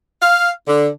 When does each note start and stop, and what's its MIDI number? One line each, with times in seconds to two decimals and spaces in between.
0.21 0.51 77
0.68 0.88 50